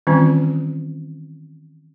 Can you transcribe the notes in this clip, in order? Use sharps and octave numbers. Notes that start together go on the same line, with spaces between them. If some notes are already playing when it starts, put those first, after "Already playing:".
D#3 E3 G3 C4 C#4 F4